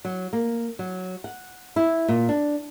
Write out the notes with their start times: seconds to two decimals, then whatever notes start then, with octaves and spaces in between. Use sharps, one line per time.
0.05 F#3
0.33 A#3
0.79 F#3
1.24 F#5
1.76 E4
2.08 A#2
2.29 D4